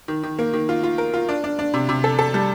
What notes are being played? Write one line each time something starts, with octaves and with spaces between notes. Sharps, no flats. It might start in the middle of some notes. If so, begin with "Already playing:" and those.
D#3
D#3
A#3
D#3
F4
F4
A#4
F4
D4
D4
D4
C3
C3
A4
A4
G3